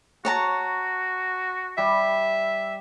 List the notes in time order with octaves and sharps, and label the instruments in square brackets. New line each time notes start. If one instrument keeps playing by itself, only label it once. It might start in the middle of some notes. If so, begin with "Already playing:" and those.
[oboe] F#4 [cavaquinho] C#5 A5 A#5
[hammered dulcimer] G3 [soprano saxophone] E5